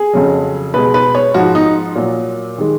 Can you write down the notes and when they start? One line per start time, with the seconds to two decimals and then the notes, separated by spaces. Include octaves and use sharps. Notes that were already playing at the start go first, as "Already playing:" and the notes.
Already playing: G#4
0.13 F2 C#3 F#3
0.74 B2 G#3 B4
0.94 B4
1.15 C#5
1.34 G#2 F3 G#3 F#4
1.55 D#4
1.96 A#2 F#3
2.58 D#3 G#3